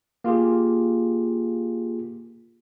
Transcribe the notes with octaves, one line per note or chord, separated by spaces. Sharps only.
A#3 F4 G4 G#4